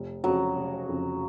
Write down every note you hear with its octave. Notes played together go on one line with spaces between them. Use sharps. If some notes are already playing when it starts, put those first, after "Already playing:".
Already playing: F1
F2 C#3 F#3
F1
F2 C#3